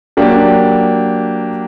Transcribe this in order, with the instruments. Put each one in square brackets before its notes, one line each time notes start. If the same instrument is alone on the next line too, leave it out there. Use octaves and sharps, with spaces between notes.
[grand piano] F#3 A#3 D4 G4